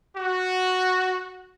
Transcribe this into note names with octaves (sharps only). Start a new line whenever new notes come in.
F#4